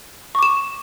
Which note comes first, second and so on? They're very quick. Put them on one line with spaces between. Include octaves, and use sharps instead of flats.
C#6 D6 E7